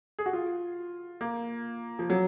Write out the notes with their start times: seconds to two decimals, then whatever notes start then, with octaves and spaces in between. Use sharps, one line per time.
0.19 G#4
0.26 F#4
0.33 F4
1.21 A#3
1.99 F3
2.10 F#3